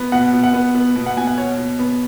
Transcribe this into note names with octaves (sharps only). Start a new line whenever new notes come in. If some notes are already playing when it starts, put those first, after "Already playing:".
Already playing: B3
B2 F#5
B2
F#5
B3
B3
B2
F#5
B2 G#5
F#5
B2 C#5
B2
B3